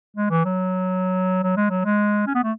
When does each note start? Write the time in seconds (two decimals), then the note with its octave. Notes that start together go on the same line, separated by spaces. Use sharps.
0.16 G#3
0.30 E3
0.45 F#3
1.43 F#3
1.57 G#3
1.70 F#3
1.85 G#3
2.26 C#4
2.35 B3
2.43 A3